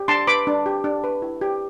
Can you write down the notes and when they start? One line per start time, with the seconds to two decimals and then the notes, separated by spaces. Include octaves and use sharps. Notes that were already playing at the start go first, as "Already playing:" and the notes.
Already playing: G4
0.08 D4 A5 C6
0.27 B4 B5 D6
0.47 D4
0.66 G4
0.84 D4
1.04 B4
1.22 E4
1.41 G4